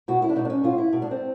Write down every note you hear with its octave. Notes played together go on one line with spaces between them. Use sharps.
B2 F#4
E4
D4
B2 D#4
D4
C#4
B2 F4
E4
B2
D4
C4